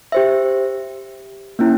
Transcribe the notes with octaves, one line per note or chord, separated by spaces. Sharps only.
G4 C5 E5
A#3 C#4 E4